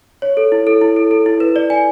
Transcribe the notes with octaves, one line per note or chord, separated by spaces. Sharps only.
C#5
A4
E4
A4
E4
A4
A4
E4
B4
D5
G#5